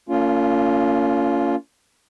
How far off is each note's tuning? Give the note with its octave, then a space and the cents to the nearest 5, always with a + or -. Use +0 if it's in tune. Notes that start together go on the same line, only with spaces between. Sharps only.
A#3 -35 C#4 +30 F4 +0